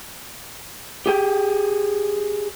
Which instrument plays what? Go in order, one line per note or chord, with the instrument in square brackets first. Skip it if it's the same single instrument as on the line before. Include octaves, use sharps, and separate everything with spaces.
[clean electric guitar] G4 G#4 G5